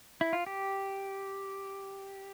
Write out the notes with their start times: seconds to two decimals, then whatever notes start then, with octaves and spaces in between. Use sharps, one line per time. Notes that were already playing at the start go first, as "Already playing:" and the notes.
0.21 E4
0.33 F4
0.46 G4